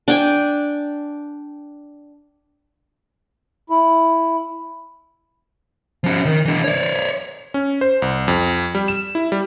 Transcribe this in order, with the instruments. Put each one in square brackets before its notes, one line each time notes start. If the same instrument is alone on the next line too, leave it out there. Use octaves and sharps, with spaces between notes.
[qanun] D4 G5 G#5
[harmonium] E4
[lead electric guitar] F3 C#4
D#3
E3 D4
C#5 D5
[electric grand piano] C#4
C5
C2
F2
G3
E7
E4
G3